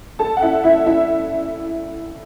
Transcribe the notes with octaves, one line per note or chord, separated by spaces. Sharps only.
A4 A5
F#5
E4 E5
E4 E5
E4 E5